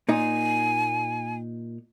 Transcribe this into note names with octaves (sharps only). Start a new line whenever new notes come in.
A#2 D#4 G#5